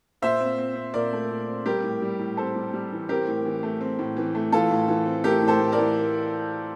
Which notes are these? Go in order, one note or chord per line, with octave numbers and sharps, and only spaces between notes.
A#2 C5 E5
C4
C4
C4
A#2 A#4 D5
A3
A#2
C4
G3 G4 A#4
A2
G3
A2
C4 A4 C5
G3
G3
E3
C4 G4 A#4
A2
E3
A3
C4
A2
E3
A3
E3 F4 A4
A2
E3
C4
A3 G4 A#4
A2
A4 C5
A2
A#4 D5
E3